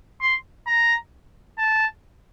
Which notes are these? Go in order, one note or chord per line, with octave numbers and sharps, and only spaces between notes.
C6
A#5
A5